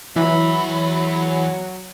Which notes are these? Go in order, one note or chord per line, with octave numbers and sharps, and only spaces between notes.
E2 E3 F#3 E5 B5